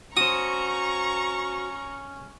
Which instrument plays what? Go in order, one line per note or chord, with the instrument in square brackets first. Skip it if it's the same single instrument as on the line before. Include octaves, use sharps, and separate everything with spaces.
[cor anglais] C#4 [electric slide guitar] F#4 C5 [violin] A#5 C#6 [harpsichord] D#6